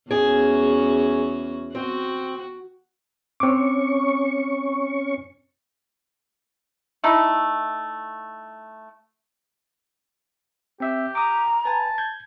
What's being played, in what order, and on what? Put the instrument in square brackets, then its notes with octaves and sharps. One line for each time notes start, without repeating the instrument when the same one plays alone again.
[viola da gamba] E2 C#4 F#4 [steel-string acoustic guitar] G#4
[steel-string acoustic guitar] C4 [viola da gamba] F#4
[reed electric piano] C4 D6 [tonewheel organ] C#4 C#6
[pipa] A3 D#4 E4
[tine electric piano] C4 E5 E6 [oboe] G4
[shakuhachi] A#5 [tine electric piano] D6 D#6
[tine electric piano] B4 G#5 [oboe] A5
[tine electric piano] G6 G#6